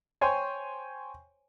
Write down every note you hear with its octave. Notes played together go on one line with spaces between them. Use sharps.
C5 C#5 G5 G#5 C6